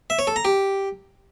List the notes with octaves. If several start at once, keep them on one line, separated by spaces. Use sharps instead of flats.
E5
C#5
A4
A#5
G4